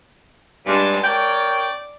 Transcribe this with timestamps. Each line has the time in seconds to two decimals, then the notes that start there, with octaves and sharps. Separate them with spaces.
0.66 G2 G#3 A5
1.03 A#4 C#5 D5 G5